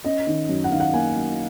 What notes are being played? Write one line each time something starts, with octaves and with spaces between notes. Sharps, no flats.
C#4 D#5
D#3
F#2
F#5
D#3 F5
F#5
A#3 G#5
F#2